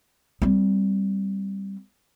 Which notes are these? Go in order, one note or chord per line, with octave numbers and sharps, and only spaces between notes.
G3 C4